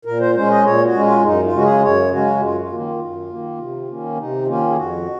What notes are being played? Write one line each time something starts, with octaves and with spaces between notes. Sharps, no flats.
A#2 A#4
C5
G#3 C#4 C5
D#5
A#2 C#5
F#4
G#3 C#4
F4
F#2 D#4
F4
C#3 G#3 C#4 F#4
G#4
F#2 C#5
C#3 G#3 C#4 F#4
F#2 F4
F4
D#3 A#3
F4
F#2
D#3 A#3
C3
D#3 A#3 C#4
C3 D#4
D#3 A#3 C#4 F4
G#4
F2 F#4